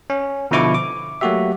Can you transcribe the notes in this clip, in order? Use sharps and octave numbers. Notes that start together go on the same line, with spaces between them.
C#4
B2 D3 F3 E4 C#6 D6
D6
F#3 A3 A#3 F#4 G4 E5